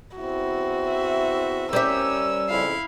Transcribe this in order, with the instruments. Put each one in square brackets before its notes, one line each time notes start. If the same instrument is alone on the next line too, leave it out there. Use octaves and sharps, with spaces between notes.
[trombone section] E2 C4 E4 [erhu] F#4
[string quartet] E5
[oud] G3 C5 E5 [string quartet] C#4 A#4 [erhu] E6
[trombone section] F2 C#3 [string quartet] E4 F5